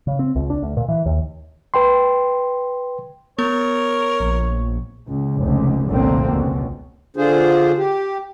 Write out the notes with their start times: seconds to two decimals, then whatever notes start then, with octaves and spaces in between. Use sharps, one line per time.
0.07 C#3
0.19 C4
0.36 C#2
0.50 D4
0.63 D2
0.77 A#2
0.89 E3
1.06 D#2
1.74 B4 G5 C6
3.39 B3 A#4 C#5
4.20 A#1
5.07 C#2
5.40 F1 C#2
5.87 F1 C2 A#2 D3 A#3 C4
6.29 C#2 B2
7.16 D3 D4 F4 G#4 C5
7.78 G4